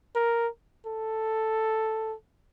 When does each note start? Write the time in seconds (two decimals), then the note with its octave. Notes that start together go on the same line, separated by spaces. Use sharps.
0.15 A#4
0.86 A4